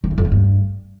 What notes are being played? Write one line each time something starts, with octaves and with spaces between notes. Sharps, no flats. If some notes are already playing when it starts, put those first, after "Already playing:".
D#3
E2
F2
D3
G2